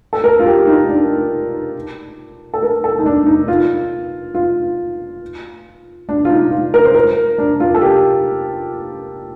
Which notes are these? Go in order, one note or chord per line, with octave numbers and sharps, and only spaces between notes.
A4
A#4
F4
G4
D#4
D4
A4
A#4
A4
D#4
D4
D#4
F4
F4
D4
F4
D#4
F4
A#4
C5
A#4
D4
F4
A4
G4